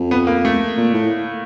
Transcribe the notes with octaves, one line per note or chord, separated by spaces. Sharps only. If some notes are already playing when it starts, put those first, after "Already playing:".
Already playing: F2
B3
A#3
A3
A#2
A2